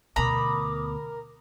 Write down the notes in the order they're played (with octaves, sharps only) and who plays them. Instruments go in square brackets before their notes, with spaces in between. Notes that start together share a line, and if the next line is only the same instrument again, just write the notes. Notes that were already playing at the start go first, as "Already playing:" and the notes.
[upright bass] D2 B2 [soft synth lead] A#4 [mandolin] A#5 B5 [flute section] D6 D#6